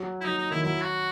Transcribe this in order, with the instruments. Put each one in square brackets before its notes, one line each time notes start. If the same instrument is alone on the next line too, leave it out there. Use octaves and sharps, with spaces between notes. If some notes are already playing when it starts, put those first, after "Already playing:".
Already playing: [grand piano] F#3
[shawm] E4
[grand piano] F#3 [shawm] D#4
[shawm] D#4
[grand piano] D#3 [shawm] E4
[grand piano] F#3 [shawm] E4
[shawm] F#4